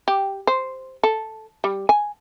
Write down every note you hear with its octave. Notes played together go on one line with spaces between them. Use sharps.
G4
C5
A4
G3
G#5